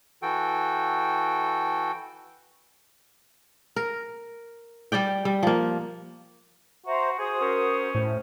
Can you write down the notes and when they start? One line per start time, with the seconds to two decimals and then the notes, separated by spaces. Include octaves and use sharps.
0.22 E3 F#4 A4 G5
3.76 A#4
4.92 G3 G4 D5 G5
5.25 G3
5.43 F3 A#3
6.86 F#4 C5 E5 A#5
7.19 F#4 G#4 C5 D#6
7.41 C#4 A#4
7.95 A2 C5